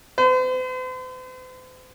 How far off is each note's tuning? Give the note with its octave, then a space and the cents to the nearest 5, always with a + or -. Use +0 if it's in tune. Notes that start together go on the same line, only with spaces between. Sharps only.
C5 -45